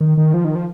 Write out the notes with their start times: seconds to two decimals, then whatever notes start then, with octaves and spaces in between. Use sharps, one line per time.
0.01 D#3
0.18 D#3
0.34 F3
0.45 D#3
0.55 F3